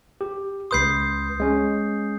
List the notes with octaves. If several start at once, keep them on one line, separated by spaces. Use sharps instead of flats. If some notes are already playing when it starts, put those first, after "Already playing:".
G4
C#2 B4 C6 D#6 G6 C7
G#3 C#4